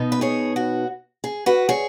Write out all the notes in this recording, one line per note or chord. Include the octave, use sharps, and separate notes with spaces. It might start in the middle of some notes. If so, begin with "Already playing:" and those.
Already playing: B2 B3 D#4
B4
G#4 C#5
F#4
G#4
F#4 B4
G#4 C#5